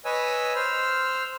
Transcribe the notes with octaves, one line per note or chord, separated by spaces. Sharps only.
B4 C#5 D#5 G#5 E6
C5 E6 F6